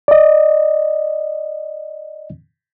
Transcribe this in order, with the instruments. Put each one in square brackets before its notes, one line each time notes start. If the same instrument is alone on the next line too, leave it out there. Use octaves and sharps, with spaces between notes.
[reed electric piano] D5 D#5